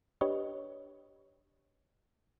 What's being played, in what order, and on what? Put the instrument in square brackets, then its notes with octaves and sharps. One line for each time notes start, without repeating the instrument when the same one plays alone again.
[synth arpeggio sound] D4 G4 B4 C#5 D#5